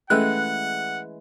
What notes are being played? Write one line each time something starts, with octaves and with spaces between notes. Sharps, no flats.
E3 G#3 A3 C#4 A4 B4 F#5 F#6